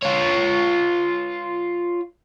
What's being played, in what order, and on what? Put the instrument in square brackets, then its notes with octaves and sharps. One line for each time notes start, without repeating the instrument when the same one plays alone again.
[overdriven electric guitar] F4 C#5